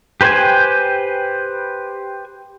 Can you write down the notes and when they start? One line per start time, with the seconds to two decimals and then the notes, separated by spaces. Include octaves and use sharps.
0.21 G4 B4 C5 G5 G#5